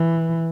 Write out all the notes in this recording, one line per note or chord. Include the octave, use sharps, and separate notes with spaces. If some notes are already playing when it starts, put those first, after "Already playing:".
Already playing: E3